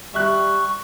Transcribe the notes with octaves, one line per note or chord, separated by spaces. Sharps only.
G3 E5 C#6 F#6